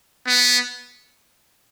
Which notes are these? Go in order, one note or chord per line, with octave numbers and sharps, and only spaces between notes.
B3